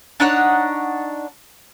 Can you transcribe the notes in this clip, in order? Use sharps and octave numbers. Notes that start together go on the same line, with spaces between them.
D4 D#4 C#5 F#5